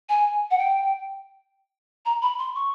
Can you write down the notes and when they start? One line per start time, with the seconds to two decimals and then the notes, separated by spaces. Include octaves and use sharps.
0.09 G#5
0.51 F#5
0.58 G5
2.06 A#5
2.22 B5
2.39 C6
2.55 C#6